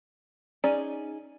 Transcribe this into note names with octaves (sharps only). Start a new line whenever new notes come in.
C#4 D#4 G#4 D5